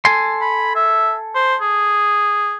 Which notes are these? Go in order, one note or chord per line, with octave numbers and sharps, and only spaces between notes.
A4 G#5 C6
B5
E5
C5
G#4